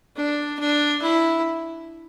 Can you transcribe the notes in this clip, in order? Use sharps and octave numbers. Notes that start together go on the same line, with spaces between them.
D4
D4
E4